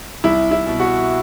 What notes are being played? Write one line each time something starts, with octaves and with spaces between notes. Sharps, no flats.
C2 E4
E4
B2
F#4